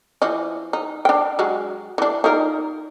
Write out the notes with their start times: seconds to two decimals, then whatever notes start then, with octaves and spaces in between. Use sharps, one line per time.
0.22 E3 F3 D#5
0.73 D#4
1.05 D4 G5
1.39 F#3 G#3
1.98 E3 D4
2.24 D#4 F4 A#4